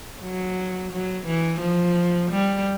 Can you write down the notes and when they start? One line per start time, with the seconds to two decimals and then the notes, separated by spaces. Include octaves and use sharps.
0.22 F#3
0.92 F#3
1.27 E3
1.61 F3
2.31 G3